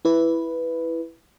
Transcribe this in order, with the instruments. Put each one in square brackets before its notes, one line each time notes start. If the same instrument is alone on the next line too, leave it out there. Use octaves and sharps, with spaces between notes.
[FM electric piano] E4 B4